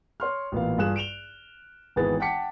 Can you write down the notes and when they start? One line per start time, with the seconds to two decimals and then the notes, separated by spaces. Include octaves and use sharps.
0.20 C#5 C6 F6
0.52 A1 A#2 B3 F5
0.78 G2 F4 G#4 F#6 E7
0.96 D7 E7 F7 G7
1.96 G#1 E3 B3 G#4 A6
2.20 F#5 G5 A5 D6 B6 C#7